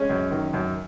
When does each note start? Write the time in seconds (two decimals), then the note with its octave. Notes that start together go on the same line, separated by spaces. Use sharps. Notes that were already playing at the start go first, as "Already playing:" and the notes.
Already playing: G#3 C#4
0.10 F#2
0.31 D#3
0.53 F#2